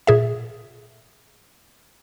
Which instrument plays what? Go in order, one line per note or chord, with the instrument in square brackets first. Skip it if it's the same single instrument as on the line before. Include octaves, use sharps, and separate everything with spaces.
[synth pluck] A#2 G#4 E5